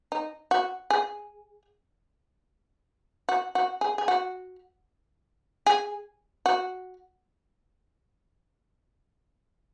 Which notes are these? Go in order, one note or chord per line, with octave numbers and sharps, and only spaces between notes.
D#4
F#4
G#4
F#4
F#4
G#4
G#4
F#4
G#4
F#4